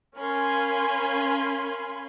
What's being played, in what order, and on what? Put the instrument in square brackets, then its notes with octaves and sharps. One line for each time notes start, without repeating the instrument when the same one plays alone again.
[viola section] C#4 A#4 F5 G#5 B5 C6